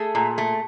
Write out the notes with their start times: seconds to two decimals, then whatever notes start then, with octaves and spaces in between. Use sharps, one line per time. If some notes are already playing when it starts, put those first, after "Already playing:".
Already playing: A3 G#4
0.15 A#2
0.38 A3